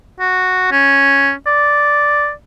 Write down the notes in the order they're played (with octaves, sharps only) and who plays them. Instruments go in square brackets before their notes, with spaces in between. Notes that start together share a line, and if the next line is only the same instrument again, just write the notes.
[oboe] F#4
C#4
D5